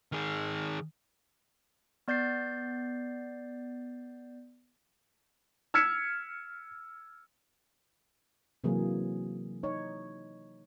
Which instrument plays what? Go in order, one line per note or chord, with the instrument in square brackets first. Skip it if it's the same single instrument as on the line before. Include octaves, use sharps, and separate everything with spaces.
[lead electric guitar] D#3 G#4
[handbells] B3 D5 G6 A6 C7
[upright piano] E6 F6 G#6 B6 C#7 E7
[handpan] C3 E3 F#3 A#3 G#4
D#4 C#5